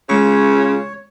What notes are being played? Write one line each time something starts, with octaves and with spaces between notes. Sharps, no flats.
C#3 G#3 F4 C#5 C#6